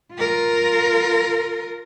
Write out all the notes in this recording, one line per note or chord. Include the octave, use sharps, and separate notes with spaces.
F4 A#4